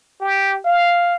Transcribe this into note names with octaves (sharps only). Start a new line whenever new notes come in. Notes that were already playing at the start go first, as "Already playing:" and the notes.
G4
F5